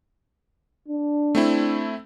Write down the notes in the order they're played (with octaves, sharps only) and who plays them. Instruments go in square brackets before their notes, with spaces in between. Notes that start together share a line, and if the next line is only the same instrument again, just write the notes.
[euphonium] D4
[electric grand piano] A3 C4 E4